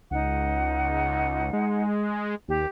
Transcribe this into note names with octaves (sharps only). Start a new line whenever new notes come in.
C#2 D#4 F#5
G#3
D#2 G4